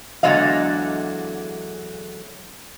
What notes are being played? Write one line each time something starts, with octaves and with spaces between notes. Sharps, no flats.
E2 D3 F#3 G#3 D#5 F5